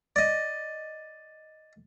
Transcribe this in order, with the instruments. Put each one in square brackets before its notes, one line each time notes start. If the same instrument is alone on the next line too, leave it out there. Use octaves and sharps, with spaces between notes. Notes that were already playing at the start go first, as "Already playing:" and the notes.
[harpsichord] D5 D#5